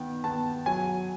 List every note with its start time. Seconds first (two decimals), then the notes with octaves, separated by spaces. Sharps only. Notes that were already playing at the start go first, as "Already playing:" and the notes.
Already playing: D#3 B3 G5
0.24 B3 A5
0.66 F#3 G#5